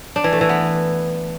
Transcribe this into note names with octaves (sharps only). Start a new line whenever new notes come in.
D4
E3
A3
E3
B3